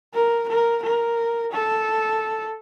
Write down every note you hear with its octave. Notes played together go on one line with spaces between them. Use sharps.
A#4
A#4
A#4
A4